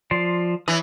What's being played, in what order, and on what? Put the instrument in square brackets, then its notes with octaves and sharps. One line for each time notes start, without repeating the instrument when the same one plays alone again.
[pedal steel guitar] F3 D5 C6
[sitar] E3 [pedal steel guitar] C#5 D#6